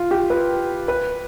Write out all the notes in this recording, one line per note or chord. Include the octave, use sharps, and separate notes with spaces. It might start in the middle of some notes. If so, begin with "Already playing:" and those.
Already playing: F4
G4
B4
B4